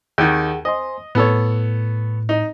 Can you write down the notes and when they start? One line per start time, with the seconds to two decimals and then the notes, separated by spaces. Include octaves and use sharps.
0.18 D#2 D#3 G#4 F#5
0.65 C5 D#5 G#5 C6
1.15 A2 B3 A4 C#5
2.29 D#4